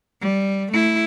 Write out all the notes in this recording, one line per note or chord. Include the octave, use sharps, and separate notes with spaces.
G3
A3 E4